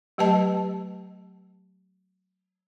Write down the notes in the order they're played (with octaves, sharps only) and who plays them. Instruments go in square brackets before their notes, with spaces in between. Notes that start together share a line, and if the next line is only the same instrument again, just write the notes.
[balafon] F#3 A3 G4 B4 D#5 A5